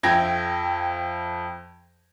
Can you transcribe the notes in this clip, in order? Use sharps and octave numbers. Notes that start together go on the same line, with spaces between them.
F2 E5 G5 G#6 A#6